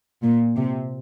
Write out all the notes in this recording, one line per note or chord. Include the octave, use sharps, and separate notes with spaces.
A#2
C3